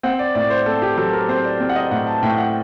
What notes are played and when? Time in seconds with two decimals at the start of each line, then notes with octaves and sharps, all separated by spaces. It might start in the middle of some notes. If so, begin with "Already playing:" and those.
0.03 C4 F#5
0.19 D5
0.35 A2 D5
0.50 C5
0.66 C4 A4
0.82 G4
0.97 F#3 A4
1.13 A#4
1.29 C4 C5
1.44 D5
1.60 C4
1.69 F#5
1.76 D#5
1.91 A2 F#5
2.07 A5
2.23 A2 G5
2.38 F#5